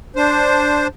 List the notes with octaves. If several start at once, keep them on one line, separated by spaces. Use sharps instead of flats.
D4 C5